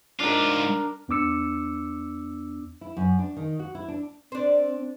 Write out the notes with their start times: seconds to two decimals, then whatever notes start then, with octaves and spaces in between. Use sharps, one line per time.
0.20 G#2 D4 F4 A#4
1.08 E2 B3 D4 D6 E6 C#7
2.81 E4
2.97 F#2
3.19 D4
3.37 D#3
3.59 F#4
3.75 E4
3.88 D4
4.32 C4 D4 C5